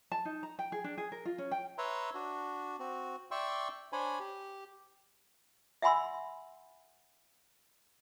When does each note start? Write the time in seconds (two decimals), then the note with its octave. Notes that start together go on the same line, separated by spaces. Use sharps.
0.12 A5
0.25 D#4
0.43 A#5
0.59 G5
0.72 G#4
0.84 D4
0.98 G#4
1.12 A#4
1.25 F4
1.38 C#4
1.51 G5
1.78 B4 C#5 E5 A#5 C6
2.14 D4 F#4
2.79 C4 F#4
3.31 D5 E5 G5 C6 C#6 E6
3.93 D4 C5 C#5 G#5 B5
4.19 G4
5.82 E5 F#5 G#5 B5 C6 E6